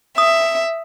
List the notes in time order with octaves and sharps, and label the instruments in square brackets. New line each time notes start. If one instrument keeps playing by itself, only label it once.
[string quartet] E5 [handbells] D#6